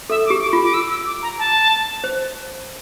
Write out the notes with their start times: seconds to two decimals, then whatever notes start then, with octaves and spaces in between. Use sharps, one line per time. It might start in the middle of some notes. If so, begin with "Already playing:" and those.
0.10 A4 E5
0.26 D6
0.30 G4
0.42 D6
0.53 F4
0.64 D6
0.74 E6
0.90 E6
1.07 D6
1.22 A#5
1.39 A5
2.04 C5